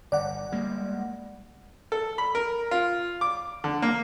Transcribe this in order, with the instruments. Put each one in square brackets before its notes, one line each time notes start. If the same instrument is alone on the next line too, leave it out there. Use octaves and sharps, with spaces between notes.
[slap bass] G1 [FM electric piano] D5 F#5
[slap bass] G3 G#3 A#3
[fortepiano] A4
B5
A#4
F4
D6
D3
A#3